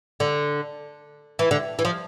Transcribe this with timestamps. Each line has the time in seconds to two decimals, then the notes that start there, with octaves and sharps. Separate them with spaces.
0.20 D3
1.39 E3
1.51 D3
1.79 E3
1.85 F3